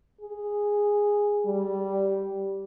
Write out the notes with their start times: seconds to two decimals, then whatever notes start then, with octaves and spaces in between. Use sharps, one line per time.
0.21 G#4
1.45 G3